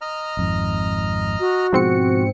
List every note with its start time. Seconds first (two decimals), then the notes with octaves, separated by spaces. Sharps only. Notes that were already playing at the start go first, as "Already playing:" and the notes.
0.01 D#5 A#5 F6
0.37 G#1 F2 G#2
1.40 F#4
1.73 G#2 B2 F3 C4 C#7